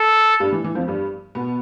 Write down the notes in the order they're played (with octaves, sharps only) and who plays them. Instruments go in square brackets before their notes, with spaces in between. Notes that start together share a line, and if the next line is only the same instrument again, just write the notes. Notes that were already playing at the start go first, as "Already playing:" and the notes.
Already playing: [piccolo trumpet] A4
[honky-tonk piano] G2 G3
E3
E3
F2 F3
G2 G3
B2 B3